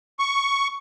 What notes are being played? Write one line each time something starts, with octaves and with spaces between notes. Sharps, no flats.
C#6